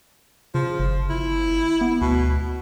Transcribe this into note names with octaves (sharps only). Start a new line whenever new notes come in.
C#3 F3
G1
E4
B3
D2 B2